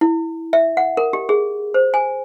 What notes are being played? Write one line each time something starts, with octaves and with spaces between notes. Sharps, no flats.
E4
E5
F#5
A#4
G4
G#4
C5
G#5